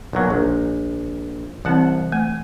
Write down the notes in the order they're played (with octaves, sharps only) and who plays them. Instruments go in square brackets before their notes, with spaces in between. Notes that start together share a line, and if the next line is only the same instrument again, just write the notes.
[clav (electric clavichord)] B1 A#2 F#3
A#1
[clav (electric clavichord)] C2 F#5 A5 [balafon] E3 C4
[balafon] A3 [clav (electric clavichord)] G#5